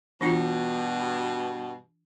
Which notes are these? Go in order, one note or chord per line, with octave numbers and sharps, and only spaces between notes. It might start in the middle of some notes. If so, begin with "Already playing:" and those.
G2 B2 E3 D4 F4